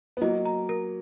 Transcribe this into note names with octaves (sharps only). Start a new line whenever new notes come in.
B3
F#3 A#3 D#5
A#5
A#4